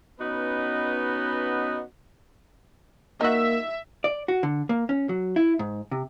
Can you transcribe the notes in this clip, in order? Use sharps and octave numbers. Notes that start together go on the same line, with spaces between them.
B3 C#4 D#4 F#4 B4 D#5
A#3 D#4 F#4 E5
D5
F#4
D3
A#3
C#4
F#3
E4
G#2
C3